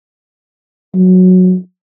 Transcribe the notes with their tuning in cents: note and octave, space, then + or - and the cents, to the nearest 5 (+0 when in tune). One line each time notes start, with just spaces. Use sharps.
F#3 -10